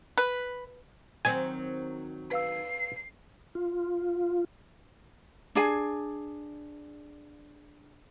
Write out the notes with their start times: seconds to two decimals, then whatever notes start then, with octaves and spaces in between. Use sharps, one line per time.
0.18 B4
1.25 D#3 F#3 C4 G#5
2.31 B4 F5 E6 C7
3.55 F4
5.55 D4 G#4 G#5